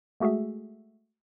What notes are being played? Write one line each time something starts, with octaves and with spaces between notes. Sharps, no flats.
G#3 A3 F#4 G#4 E5